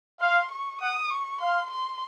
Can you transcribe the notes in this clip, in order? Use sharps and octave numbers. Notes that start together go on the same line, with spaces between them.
F5 C6
C#6
F#5 D#6
C#6
F5 C6
C6